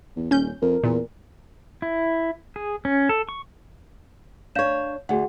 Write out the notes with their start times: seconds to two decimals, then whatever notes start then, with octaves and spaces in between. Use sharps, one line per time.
0.16 E2
0.31 D#1 C#4 G6
0.62 F2 A#4
0.84 E2 A#2
1.82 E4
2.56 G#4
2.85 C#4
3.09 A4
3.29 C#6
4.55 D4 C#5 F5 G6 E7
5.09 D2 F#4 G#4 F#5